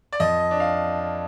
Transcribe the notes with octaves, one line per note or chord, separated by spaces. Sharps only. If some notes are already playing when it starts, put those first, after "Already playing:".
D5
F2 D#5
D4
F5